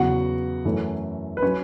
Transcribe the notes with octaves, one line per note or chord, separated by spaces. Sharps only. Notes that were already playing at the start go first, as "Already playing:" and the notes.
Already playing: E2 C#3 F#3 B3 F#4 F#5
F#2 E3 A3 C#4
B4
F#3 C#4 C#5